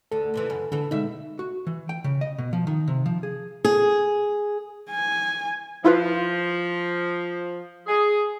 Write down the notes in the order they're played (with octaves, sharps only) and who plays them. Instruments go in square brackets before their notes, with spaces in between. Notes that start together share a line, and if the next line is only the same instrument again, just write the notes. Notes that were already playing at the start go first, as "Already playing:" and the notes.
[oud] D2 D3 [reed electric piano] A4
[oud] D#2 C3 E3
F#2 C#3
[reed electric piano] D3 [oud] E3 A4
[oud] B2 E5 [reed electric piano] G#3 D#4
[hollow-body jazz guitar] F#4
E3
G5
C#3
D#5
B2
F3
D#3
C3
F3
G#4
[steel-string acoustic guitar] G#4
[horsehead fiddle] G#5
[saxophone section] F3 [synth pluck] E4 F4 B4
[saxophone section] G#4